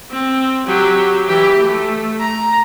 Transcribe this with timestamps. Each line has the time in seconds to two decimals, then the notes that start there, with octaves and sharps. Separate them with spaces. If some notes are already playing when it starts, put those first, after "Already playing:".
0.11 C4
0.66 F#3 G4
1.28 E3 G4
1.58 A3
2.20 A#5